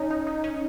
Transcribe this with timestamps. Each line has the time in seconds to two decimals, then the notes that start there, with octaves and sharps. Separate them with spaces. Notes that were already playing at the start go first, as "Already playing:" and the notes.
Already playing: C#4 D#4
0.11 D#4
0.27 D#4
0.44 C#4